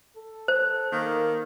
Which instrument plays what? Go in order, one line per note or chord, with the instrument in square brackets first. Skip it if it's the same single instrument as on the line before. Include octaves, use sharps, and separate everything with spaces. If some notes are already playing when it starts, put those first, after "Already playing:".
[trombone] A4
[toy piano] C5
[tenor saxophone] D#3 [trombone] A#3